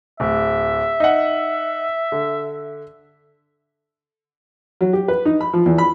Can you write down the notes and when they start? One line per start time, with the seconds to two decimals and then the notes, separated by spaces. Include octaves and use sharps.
0.20 D1 E5
1.00 D#4 F#5
2.12 D3
4.81 F#3
4.93 G4
5.08 B4
5.25 D#4
5.41 B5
5.53 F3
5.66 E2
5.78 B5